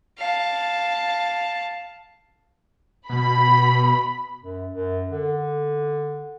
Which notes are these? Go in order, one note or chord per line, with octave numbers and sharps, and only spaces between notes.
F5 A5
B2 B5
F#2
F#2
D3